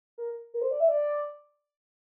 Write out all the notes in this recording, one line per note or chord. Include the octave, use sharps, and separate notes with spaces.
A#4
A#4
C5
D5
E5
D5